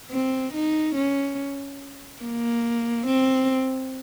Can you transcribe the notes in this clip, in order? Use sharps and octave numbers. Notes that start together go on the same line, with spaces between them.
C4
D#4
C#4
A#3
C4